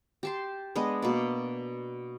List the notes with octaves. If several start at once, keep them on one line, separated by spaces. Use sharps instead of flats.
G4 A5 C6
G#3 B3 D4 D#5
B2 A#3 D5